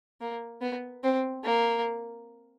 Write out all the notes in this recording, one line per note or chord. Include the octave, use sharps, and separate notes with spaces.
A#3
B3
C4
A#3